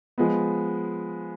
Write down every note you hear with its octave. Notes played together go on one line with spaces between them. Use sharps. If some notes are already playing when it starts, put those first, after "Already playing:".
F3 G#3 B3